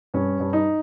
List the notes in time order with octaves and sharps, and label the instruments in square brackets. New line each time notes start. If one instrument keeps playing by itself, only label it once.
[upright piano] G2 C#4
G2
D#4